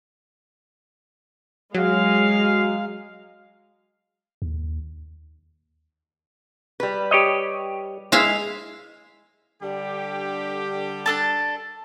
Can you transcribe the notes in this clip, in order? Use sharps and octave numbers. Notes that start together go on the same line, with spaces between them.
F#3 G#3 F5
D#2
G3 B4
G4 C#5 D#5
G#3 E4 E5 F5
D3 G3 G4
D4 A4 A5